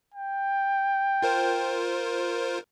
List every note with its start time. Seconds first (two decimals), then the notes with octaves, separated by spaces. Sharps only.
0.14 G5
1.22 F4 A#4 C5